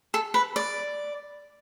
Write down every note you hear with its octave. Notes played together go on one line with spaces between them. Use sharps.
A4
B4
D5